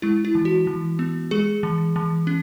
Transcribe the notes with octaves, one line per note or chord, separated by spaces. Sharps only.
G#3 E4
E4
E3
F#4
E3
B3
G#3 G#4
E3
E3
C#4